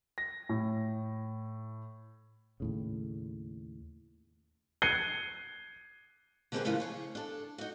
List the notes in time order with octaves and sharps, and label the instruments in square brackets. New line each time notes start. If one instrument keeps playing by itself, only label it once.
[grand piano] A#6
A2
[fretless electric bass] D#2 A2 C#3
[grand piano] F#6 G#6 C7 C#7 D#7 G7
[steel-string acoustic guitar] D3 A#3 C4 G4 G#4 B4
A2 C#3 E3 F3 A3 A#3
G#4 C#5
D4 A4
D#4 F#4